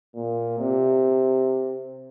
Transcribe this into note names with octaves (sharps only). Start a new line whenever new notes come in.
A#2
C3